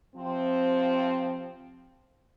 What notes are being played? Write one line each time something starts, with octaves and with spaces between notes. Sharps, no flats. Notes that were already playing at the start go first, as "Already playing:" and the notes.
C3 F3 C4